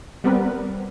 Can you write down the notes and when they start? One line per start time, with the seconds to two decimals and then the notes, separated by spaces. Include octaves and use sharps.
0.24 G3 B3 C4 A#4 B4